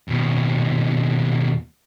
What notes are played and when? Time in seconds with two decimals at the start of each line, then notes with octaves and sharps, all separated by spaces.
0.08 D#2 B2